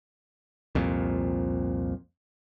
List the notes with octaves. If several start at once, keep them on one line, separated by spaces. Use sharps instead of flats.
C2 F2 A#2